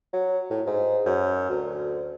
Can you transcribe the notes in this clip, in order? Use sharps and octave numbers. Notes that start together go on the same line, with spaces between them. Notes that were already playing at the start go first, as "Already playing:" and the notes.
F#3
A2
G#2
F#2
D2